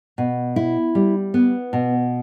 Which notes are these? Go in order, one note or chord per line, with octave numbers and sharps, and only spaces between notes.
B2
E4
G3
B3
B2